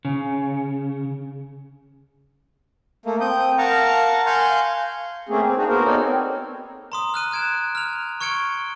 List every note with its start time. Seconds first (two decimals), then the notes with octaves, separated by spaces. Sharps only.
0.05 C#3
3.06 A3 A#3
3.21 C4 D#6 G6
3.58 A#4 F5 F#5 A5 A#5 C#6
4.26 F5 G#5 C6 C#6 F#6 G6
5.29 A3 A#3 C4 C#4 G#4
5.46 C4
5.57 A#3 D4 D#4 F#4 G#4
5.68 A#3 B3 F#4 A#4 C5
5.85 B3 C#4 D#4 A4 C#5 D5
6.02 C4
6.92 A#5 C6 D#6
7.14 F6 F#6 D#7
7.32 F#6 G#6 D7 E7
7.75 F6 F7
8.21 C#6 F6 G#6 C#7 D7 G7